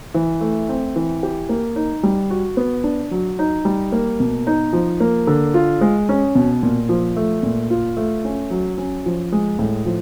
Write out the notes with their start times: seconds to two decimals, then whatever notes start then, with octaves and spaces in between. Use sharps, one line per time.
0.14 E3
0.41 A3
0.69 C4
0.96 E3
1.23 G4
1.49 A#3
1.76 D#4
2.03 G3
2.30 F#4
2.57 B3
2.84 D4
3.11 F#3
3.39 D#4
3.65 G3
3.92 A#3
4.20 B2
4.47 D#4
4.73 F3
5.00 A#3
5.27 D3
5.54 F4
5.81 G#3
6.09 C#4
6.35 B2
6.63 A#2
6.89 F3
7.17 A3
7.43 A#2
7.70 F4
7.97 A3
8.25 C#4
8.51 F#3
8.78 C#4
9.06 F3
9.32 G#3
9.59 A2
9.86 F3